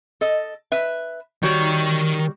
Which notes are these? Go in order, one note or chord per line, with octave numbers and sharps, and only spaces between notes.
A4 D#5
B4 E5
D#3 G3 F#4 C#5 G5